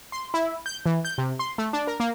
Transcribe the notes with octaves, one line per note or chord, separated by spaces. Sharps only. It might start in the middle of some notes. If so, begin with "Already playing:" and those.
C6
E4
G6
E3
G6
C3
C6
A3
D4
A#4
A#3